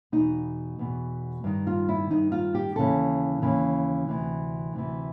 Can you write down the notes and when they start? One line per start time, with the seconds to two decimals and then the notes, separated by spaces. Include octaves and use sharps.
0.12 E2 B2 D#4
0.79 E2 B2
1.44 G2 D#3
1.67 F4
1.89 E4
2.10 G2 D#3 D#4
2.32 F4
2.55 G4
2.76 D#2 C#3 E3 A4
3.42 D#2 C#3 E3
4.09 D2 C3 E3
4.74 D2 C3 E3